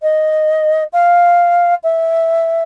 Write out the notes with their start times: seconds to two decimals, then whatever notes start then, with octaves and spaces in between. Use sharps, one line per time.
0.02 D#5
0.93 F5
1.83 E5